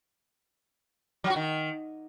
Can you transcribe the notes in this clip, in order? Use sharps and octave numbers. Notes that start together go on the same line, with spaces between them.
F#3
F#4
D#3